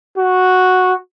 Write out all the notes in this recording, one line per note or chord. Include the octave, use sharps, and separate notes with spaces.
F#4